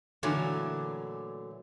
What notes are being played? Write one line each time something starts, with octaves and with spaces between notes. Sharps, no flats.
A#2 D3 E3 F#3 A3